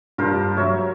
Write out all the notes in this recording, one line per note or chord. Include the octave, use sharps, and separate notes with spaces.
G2 F4 A#4 C5
F#3 C#5 E5